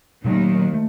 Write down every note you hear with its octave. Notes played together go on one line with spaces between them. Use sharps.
D#2 A#2 D#3 F#3 A3 C#4
A3